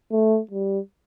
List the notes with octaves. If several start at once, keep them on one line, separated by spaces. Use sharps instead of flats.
A3
G3